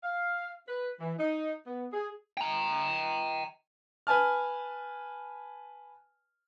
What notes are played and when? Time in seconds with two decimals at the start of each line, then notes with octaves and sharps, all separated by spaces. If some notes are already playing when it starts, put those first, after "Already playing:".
0.03 F5
0.67 B4
0.99 E3
1.18 D#4
1.67 B3
1.93 G#4
2.37 G5 A#5
4.07 B4 G#5 A5 F6